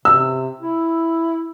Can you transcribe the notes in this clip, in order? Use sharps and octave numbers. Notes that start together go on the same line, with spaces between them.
C3 E6
E4